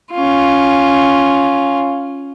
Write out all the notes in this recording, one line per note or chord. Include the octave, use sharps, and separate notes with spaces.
C#4 F4